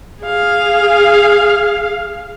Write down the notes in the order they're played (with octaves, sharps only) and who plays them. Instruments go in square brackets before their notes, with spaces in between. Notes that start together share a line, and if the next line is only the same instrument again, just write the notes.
[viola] G#4 F5